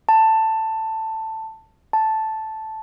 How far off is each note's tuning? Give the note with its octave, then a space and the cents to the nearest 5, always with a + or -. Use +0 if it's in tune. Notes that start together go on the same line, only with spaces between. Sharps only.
A5 +10
A5 -5